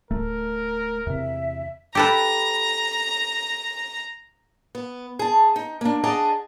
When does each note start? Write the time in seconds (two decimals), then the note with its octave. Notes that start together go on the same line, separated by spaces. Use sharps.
0.11 D1 A3 A#4
1.07 E2 C3 E5
1.95 G4 A4 B4 A#5
4.75 B3
5.19 G#4 A5
5.56 D#4
5.81 A#3 D4
6.04 G#4 D5 D#5 F#5 A5 A#5